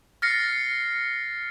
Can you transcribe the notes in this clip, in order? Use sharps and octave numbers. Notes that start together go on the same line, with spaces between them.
F6 A6 A#6 C7 C#7